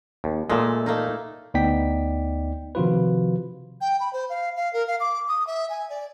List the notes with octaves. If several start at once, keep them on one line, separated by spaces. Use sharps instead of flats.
D#2
A#2 G#3 A3
A3 A#3 D#4
D2 B3 D#4 D5 G5 B6
C3 D#3 F3 F4 F#4 B4
G5
B5
C5
F5
F5
A#4
F5
D6
D#6
E5
G#5
D5